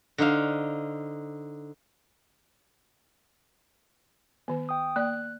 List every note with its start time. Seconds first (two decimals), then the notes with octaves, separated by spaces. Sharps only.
0.18 D3 D#4 C5 F5
4.48 D#3 B3
4.69 G5 D#6
4.96 A#3 D5 F#6